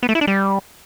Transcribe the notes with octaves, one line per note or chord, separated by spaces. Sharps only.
B3
A3
E4
D4
G3